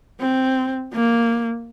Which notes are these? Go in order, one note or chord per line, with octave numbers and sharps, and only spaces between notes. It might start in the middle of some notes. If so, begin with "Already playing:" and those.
C4
A#3